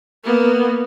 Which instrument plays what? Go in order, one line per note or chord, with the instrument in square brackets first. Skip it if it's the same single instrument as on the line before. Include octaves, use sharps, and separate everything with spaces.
[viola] A#3 B3